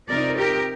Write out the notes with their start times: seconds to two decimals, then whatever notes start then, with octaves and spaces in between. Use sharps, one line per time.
0.09 C3 F3 C4 D#4 A#4 D5
0.38 G4 A#4